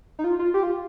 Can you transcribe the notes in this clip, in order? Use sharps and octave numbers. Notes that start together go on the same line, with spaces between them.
D#4
F4
F4
G4
F4